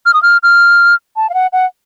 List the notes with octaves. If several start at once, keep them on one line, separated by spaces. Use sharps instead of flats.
F6
D#6
F6
F6
A5
F5
F#5
F#5